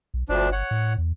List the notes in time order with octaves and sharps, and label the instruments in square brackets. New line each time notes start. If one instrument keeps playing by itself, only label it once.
[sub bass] B1
[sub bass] G1 [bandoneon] D2 F3 D4
[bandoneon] C#5 F#5
[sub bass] A2
E2